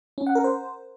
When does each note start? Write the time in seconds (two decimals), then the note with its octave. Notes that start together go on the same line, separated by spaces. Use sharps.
0.18 C#4
0.27 F#5
0.35 A#4
0.44 C5